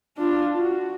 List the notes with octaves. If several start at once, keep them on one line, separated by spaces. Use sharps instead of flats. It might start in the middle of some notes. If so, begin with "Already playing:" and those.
D4 F4
F#4